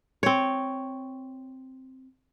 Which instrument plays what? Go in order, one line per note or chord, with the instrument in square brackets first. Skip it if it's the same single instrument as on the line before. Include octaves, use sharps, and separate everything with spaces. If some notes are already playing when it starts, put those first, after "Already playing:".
[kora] C4 C#5